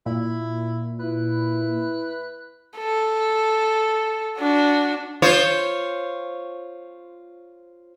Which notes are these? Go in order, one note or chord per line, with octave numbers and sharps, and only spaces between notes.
A#2 E4
E4 B4
A4
D4 F#4
F4 C5 C#5